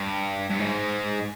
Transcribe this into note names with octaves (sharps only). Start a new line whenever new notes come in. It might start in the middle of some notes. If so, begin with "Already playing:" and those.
Already playing: G2
G2
G#2